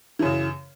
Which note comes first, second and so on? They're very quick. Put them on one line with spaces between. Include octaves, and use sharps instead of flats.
E3 F#2 C#3